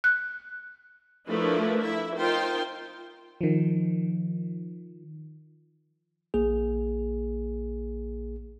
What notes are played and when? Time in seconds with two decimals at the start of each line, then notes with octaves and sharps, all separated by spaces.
0.04 F#6
1.27 F3 A3 D4 E4 A#4 B4
1.83 E4 E5
2.17 D#4 F4 A#4 C5 G5 C6
3.41 D#3 F3
6.34 A#1 A#3 G#4